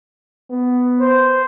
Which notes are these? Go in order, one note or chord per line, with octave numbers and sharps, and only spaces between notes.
B3
C5